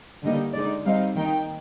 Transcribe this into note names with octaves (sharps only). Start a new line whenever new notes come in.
D3 G3 A#3 D#4 D#5
D3 G#3 D#4 D5
G3 C4 D#4 F5
D#3 A#3 D#4 G5